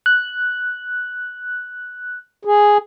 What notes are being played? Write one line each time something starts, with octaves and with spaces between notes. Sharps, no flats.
F#6
G#4